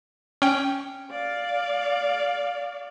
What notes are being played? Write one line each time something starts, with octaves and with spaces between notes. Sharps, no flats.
C#4 G5
D5 F5